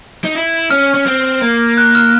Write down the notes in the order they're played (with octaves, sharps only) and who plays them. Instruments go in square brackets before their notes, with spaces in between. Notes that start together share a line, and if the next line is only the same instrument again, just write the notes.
[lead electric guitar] D#4
E4
[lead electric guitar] C#4 [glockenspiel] F6
[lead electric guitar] C#4
C4
A#3
[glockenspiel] F#6
F6